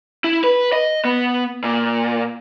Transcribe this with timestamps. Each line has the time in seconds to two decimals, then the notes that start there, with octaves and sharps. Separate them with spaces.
0.24 E4
0.44 B4
0.73 D#5
1.05 B3
1.64 A#2